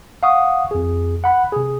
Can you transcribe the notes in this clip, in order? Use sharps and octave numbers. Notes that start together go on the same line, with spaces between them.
F5 F#5 C#6 D#6
F2 G#4
F#5 B5 F#6
C3 G#4